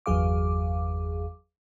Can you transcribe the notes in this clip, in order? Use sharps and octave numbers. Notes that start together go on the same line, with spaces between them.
G1 E2 F#3 G#4 F5 D6